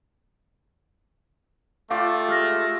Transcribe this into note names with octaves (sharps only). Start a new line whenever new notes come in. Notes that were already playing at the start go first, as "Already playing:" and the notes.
A3 F4 G4 D5 F5
G#3 G4 F6 A#6